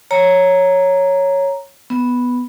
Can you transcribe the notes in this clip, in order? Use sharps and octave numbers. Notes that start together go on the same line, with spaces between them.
C#5 A#5
B3